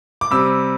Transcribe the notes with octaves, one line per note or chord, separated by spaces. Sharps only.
D6
C3 G3 E6